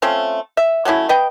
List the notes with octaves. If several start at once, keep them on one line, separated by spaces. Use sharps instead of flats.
A3 C4 C#4 F4
E5
F#3 A3 C#4 E4
B4 D#5 G5